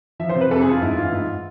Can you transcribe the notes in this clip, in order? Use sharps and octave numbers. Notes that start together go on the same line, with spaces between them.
F3 E5
C5
C3
B4
F2 A4
G#4
F2
F4
G#2 E4
E3 F4
G#2